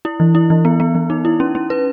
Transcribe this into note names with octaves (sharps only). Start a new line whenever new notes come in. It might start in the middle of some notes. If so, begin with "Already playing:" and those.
E4
E3
E4
E3
B3
B3
E3
D#4
E4
C#4
C#4
B4